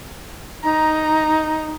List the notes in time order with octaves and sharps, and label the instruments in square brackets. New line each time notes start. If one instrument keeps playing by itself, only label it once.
[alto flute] D#4 [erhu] A#5